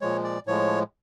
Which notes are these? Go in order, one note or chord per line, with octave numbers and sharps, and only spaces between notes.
A#2 F3 G#3 C#5
D5
A2 F3 G#3 C#5